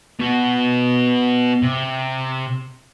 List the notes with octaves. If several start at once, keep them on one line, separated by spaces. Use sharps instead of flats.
B3 F#4
C3